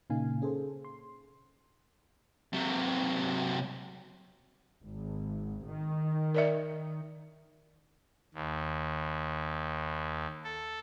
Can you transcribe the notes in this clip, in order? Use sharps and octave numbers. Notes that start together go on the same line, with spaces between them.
A#2 C#3 A#3 D#4 F5 G#5
C#4 G#4 A4 C5
C6
C3 F#3
G#1
D#3
A#4 D5 E5
D#2
A4